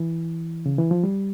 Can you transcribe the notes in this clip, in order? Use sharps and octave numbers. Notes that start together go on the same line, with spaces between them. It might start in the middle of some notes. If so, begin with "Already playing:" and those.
Already playing: E3
C#3
E3
F3
G3